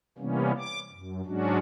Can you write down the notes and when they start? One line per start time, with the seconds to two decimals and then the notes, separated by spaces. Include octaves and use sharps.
0.18 C3 E3 G3 A#3 B3 C#4
0.58 D6
0.91 F#2
1.26 G#2 F#3 G#3 C#4 D4 F#4